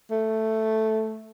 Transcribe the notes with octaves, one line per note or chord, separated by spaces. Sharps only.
A3